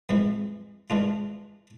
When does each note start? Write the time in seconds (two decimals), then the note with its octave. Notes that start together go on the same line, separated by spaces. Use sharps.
0.09 F2 E3 G#3
0.90 E3 G#3 D4 F4